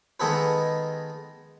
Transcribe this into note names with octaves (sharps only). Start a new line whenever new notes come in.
D#3 G#3 B3 G#4 A4 B4